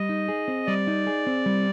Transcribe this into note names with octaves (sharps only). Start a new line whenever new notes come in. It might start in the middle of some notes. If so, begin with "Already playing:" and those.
Already playing: G3 D#5
D#4
G#4
C4
G3 D5
D#4
G#4
C4
G3